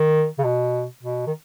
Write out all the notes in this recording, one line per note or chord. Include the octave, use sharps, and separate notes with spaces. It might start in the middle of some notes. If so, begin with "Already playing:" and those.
Already playing: D#3
C#3
B2
B2
D#3